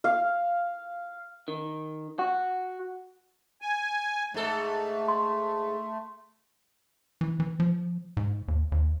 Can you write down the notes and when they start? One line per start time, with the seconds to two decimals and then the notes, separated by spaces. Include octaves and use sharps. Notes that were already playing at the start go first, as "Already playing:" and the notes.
0.04 F5
1.48 D#3
2.19 F#4
3.62 G#5
4.34 G#2 A3 A4
5.08 C6
7.21 E3
7.40 E3
7.60 F3
8.17 G#2
8.48 D#2
8.72 D#2